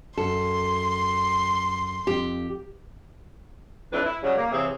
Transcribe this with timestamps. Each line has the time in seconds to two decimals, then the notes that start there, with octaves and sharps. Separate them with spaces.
0.18 F#2 A4 C6
2.07 F2 G4
3.92 F2 A2 D4 E4 B4
4.04 E4
4.22 C#3 F#3 G3
4.36 A#3
4.51 C3 E3 C4 G#4 C#5 E5